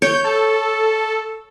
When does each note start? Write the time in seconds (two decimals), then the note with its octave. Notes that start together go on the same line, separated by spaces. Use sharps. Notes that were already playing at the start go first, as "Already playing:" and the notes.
0.02 C#5 G6
0.24 A4